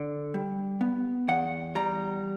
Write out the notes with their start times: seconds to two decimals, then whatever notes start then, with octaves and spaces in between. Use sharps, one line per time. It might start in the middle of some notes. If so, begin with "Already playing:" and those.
Already playing: D3
0.34 G3
0.81 B3
1.28 E2 F#5
1.75 G3 A#5